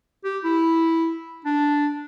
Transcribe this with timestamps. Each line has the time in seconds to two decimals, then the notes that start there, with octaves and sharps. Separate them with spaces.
0.24 G4
0.44 E4
1.45 D4